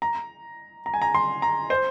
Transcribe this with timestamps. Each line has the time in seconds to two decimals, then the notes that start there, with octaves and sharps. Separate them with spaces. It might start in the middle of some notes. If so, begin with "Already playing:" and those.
0.02 A#5
0.86 A#5
0.94 G#5
1.02 A#5
1.15 C6
1.42 A#5
1.70 C5